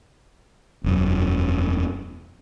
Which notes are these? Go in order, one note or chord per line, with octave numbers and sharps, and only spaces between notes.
E1 F#2